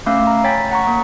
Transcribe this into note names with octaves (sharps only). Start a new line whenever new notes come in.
A3 C#4 F5 E6
A#5
C#5 G5 G#5 B5 A6 B6
F#5 A#5 C#6
A#3